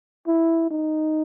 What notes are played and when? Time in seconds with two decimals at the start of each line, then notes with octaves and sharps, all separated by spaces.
0.27 E4
0.71 D#4